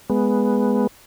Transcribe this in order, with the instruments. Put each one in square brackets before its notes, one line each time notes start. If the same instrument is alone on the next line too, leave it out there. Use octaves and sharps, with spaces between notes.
[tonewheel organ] G#3 B3